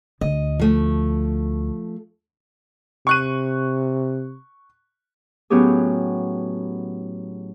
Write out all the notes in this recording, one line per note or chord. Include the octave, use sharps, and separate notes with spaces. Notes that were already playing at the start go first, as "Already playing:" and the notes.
D2 D#5
F3 A3
C3 C#6 F#6 D#7
A2 F#3 B3 C#4 G4 G#4